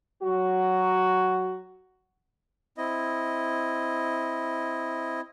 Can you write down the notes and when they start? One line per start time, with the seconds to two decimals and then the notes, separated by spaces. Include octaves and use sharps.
0.23 F#3 F#4
2.78 C4 E4 D#5